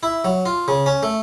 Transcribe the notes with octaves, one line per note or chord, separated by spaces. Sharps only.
E4
F#3
F4
C#3
C#4
A3